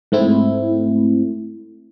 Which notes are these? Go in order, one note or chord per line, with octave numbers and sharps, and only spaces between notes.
G#2 A3 C4 E4